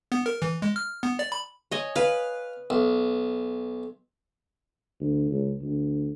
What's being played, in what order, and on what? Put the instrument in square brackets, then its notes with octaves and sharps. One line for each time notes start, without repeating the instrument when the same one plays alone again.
[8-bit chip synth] B3
A#4
E3
G#3
F6
B3
D5
B5
[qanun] C#5 D#5 G#5
[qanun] B4 [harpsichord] F5
[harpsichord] B1
[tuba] D2
C#2
D2